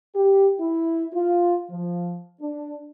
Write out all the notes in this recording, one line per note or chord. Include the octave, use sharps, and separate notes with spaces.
G4
E4
F4
F3
D4